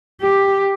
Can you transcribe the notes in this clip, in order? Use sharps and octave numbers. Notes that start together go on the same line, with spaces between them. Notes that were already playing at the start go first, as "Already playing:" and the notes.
G4